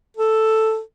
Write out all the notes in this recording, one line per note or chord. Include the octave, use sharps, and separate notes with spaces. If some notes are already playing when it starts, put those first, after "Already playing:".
A4